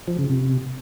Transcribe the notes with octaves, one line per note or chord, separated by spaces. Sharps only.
F3
C#3
C3